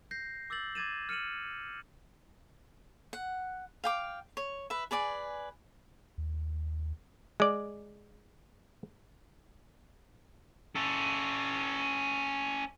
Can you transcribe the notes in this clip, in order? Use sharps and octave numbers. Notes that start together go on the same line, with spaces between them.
G6 A#6 C7
D6 E6 G6 A6 F#7
D6 G#6 A6 D#7 E7
F6 C#7 D#7 E7 F#7
F#5
F5 G5 D6
C#5
B4 E5
G#4 B4 D5 G#5
D#2
G#3 D5
C#4 A4